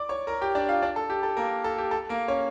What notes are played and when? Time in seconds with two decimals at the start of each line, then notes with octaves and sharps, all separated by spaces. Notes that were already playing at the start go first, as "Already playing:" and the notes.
Already playing: D5 D6
0.09 C#5 C#6
0.27 A#4 A#5
0.41 G4 G5
0.55 D4 D5
0.68 F4 F5
0.82 D4 D5
0.96 A4
1.10 G4
1.23 A4
1.37 A#3 A#4
1.64 A4
1.78 G4
1.91 A4
2.09 A#3 A#4
2.28 C#4 C#5